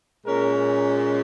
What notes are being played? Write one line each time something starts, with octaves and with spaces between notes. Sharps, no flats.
A#2 G#3 C#4 A#4